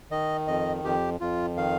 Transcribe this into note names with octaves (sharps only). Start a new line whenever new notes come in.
D#3 D#5
F2 D#5
F2 G4
F2 F4
D#3 F5